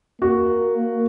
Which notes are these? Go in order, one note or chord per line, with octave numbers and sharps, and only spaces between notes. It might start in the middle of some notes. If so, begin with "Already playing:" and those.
A#3 F#4